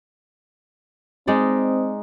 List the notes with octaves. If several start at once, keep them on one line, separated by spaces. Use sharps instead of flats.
G#3 C4 D#4 D5